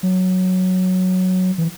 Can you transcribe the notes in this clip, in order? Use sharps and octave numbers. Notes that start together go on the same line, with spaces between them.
F#3
E3